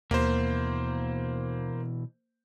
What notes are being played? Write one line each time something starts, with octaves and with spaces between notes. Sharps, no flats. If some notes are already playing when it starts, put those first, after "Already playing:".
D#2 B2 E3 A#3 C5